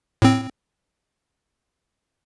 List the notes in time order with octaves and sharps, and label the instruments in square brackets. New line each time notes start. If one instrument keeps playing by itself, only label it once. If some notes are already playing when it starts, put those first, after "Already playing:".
[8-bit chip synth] A2 C4